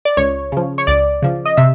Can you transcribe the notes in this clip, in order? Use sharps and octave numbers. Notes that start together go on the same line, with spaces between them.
D5
C#2 C#5
C#3 F3
C#5
C#2 D5
C#3 F3
D#5
C3 E5